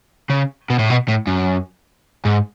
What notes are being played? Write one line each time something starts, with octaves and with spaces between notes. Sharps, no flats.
C#3
B2
A2
B2
A2
F#2
G#2